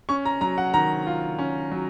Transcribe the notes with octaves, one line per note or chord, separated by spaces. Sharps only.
C#4 C#6
A#5
F#3 A#5
F#5
D#3 A#5
F4
C#4
F#3